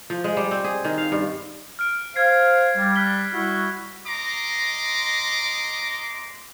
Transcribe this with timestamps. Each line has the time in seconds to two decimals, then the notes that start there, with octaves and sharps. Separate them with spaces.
0.10 F3
0.24 G#3
0.37 G3
0.51 C4
0.64 G#4
0.85 D#3
0.98 F5
1.12 G2
1.79 F6 D7
2.16 C5 F5 G#6 C7
2.77 G3
2.96 F#6 B6 G7
3.34 G3 E4 F#4
4.07 D#5 A#5 C6 D6